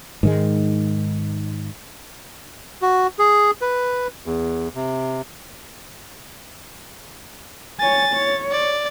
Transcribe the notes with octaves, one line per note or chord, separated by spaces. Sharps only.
G#2 D#3 G#3
F#4
G#4
B4
E2
C3
C#5 G#5 A6
C#5
D5